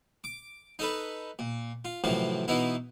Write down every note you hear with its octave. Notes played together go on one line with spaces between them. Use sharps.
D6
D#4 A4 B4
A#2
F4
F#2 A2 C3 E3 F3 F4
B2 E3 B3 D#4 E4